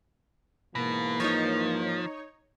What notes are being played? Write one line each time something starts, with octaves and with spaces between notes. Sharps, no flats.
G#2 B2 E3 A#3
F3 D#4 C#5